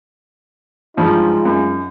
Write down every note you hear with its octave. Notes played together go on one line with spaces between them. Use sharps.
G2 F3 G#3 D#4 F4
F#2